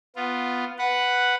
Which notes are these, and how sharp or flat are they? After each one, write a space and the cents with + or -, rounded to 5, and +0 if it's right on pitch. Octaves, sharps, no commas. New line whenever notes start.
B3 +0 F4 +0
B4 +0 F#5 +0